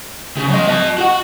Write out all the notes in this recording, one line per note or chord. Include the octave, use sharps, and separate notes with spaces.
C#3
F#3 D#5
D#5 A5
F#4 F#5